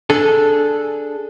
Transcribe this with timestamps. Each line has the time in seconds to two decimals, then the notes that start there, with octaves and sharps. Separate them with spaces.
0.10 D4 G#4 A4